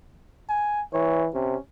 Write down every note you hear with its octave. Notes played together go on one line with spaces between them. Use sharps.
G#5
E3 C#5
C3 C#4